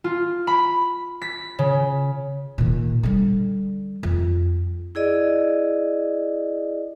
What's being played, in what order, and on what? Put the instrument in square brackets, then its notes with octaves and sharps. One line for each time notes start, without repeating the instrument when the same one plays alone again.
[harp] F4
B5
B6
C#3
[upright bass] A#2 D#3
D3 G3
F2
[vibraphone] E4 G#4 D5 D#5